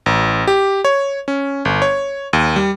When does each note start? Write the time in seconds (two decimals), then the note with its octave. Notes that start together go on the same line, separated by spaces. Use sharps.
0.06 A1
0.48 G4
0.85 C#5
1.28 C#4
1.65 G1
1.82 C#5
2.33 D#2
2.56 G3